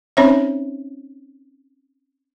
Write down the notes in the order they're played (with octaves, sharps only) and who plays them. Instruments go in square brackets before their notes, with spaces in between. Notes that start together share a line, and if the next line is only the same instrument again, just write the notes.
[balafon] C4 C#4 D#4 C5 C#5 E5